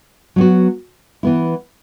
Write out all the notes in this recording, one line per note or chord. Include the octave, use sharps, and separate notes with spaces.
F#3 B3 F#4
E3 B3 E4